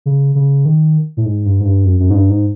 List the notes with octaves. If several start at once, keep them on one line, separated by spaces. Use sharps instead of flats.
C#3
C#3
D#3
A2
G#2
G2
G#2
G2
F#2
F#2
G#2
G2
G#2